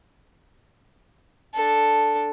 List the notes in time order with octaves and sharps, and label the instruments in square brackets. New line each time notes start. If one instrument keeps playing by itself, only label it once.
[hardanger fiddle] D4 A4